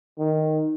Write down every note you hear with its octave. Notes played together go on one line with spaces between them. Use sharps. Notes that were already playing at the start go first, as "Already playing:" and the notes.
D#3